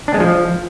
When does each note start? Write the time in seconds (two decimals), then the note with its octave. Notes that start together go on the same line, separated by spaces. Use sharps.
0.08 D4
0.14 G#3
0.20 F3